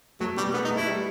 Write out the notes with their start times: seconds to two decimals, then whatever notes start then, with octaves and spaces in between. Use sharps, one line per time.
0.20 F#3 A3
0.37 B2 G3
0.54 A3 B3
0.65 D#4
0.70 A3 E4
0.87 G3